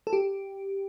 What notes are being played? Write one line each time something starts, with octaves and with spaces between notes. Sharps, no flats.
A4
G4